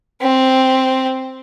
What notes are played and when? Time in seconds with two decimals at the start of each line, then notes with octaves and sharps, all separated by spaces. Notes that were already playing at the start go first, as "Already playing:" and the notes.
0.22 C4